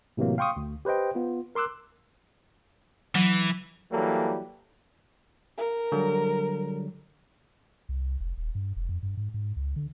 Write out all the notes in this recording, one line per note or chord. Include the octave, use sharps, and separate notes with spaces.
A2 C3 E3 F#3 A#3
F5 G5 C6 C#6 D#6
D2
G4 B4 C5 D#5 G5
B3 F4
A#4 C6 D6 E6 F#6
E3 F#3
E3 F#3 G3 A#3 A4
A#4
D3 F#3 G3
C2
F1
D#1
G2
F1
F2
G2
G#2
G#2
C#2
D3